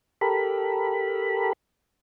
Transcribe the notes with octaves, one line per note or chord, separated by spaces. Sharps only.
G4 A4 A#4 B5